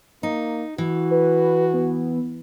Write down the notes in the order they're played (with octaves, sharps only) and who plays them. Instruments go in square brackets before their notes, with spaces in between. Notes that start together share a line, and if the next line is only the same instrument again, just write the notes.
[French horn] A#3 [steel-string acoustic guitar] D#4
[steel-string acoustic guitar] E3 [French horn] F#4
[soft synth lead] B4
B3